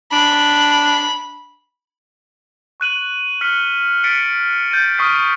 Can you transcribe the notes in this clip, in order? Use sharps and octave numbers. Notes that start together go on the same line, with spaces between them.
D4 B5
C#6 F#6 D#7 F#7
F6 B6 C#7
A6 B6 C#7 D7
G6 A6 D#7
C#6 D#6 F6 B6 C7 D7